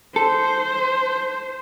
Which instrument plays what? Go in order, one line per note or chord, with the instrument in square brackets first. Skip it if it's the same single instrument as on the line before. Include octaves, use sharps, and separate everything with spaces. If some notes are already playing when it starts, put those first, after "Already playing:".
[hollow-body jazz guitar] A4 [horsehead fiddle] C5